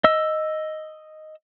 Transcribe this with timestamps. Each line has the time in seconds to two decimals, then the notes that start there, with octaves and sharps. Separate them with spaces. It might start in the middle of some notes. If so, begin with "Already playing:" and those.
0.04 D#5 E6